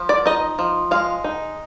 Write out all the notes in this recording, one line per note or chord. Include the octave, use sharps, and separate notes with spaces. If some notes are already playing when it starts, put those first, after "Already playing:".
Already playing: F3
D5
D#4 D#5
F3
G#3 F5
D#4